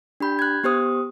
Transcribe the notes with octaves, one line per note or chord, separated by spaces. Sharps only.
D4 G4 B5 G6
F#6 G#6
B3 G4 C5 D#6